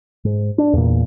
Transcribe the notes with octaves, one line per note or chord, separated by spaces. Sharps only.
G#2
D4
E2 A#2